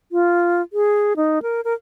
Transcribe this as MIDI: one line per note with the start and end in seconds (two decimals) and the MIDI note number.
0.12 0.62 65
0.73 1.13 68
1.17 1.42 63
1.42 1.61 70
1.65 1.74 70